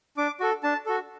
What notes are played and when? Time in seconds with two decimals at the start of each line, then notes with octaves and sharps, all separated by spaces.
0.17 D4 D6
0.40 F#4 A4
0.63 D4 A5
0.86 F#4 A4